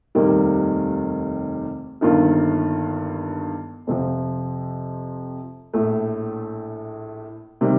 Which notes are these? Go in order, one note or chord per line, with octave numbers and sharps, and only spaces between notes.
F1 D#2 D#3 G3 A#3
G1 G2 D#3 A#3 F4
F2 C3 F3
A#1 A2 A3
C3 D#3 G3